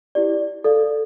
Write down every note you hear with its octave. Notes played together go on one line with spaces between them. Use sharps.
E4 G4 D5
A4 D5 F5